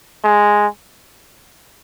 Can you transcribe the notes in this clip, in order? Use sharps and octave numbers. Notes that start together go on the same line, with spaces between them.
G#3